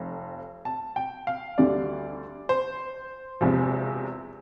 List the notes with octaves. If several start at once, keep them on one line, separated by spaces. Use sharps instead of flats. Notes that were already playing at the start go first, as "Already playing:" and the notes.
Already playing: F1 F2
A5
G5
F5
D2 D3 G3 D5
C5
E1 E2 C3 F3